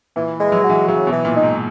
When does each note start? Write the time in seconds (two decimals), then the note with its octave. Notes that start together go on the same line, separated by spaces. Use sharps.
0.16 A#2 E3
0.40 G#3
0.52 F#3
0.64 F#4
0.70 E3
0.88 C#3 F#3
1.07 B2
1.12 E3
1.25 A#2
1.36 D#4
1.43 G#2